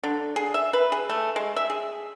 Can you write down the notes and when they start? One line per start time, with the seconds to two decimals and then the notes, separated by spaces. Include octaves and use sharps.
0.03 D3
0.36 G#4
0.54 E5
0.73 B4
0.92 G#4
1.09 A3
1.36 G#3
1.56 E5
1.70 G#4